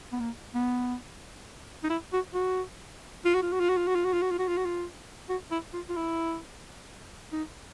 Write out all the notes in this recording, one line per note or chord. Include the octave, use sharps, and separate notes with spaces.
B3
A#3
B3
D#4
E4
F#4
F#4
F4
F#4
F4
F#4
F4
F#4
F4
F#4
F4
F#4
F4
F#4
F4
F#4
F4
F#4
F4
F#4
E4
F4
F4
E4
D#4